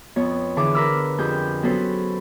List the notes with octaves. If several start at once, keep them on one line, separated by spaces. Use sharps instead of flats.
F2 B3 C#5
D3 E3 G#4 A5 D6
A#4 B4 B5 D6 E6 F6
F2 G4 G#4 G#5 G6
F#3 B3 C#4 A4 B4 C5